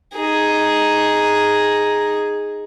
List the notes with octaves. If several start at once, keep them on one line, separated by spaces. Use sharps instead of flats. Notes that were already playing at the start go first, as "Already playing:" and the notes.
D#4 G#4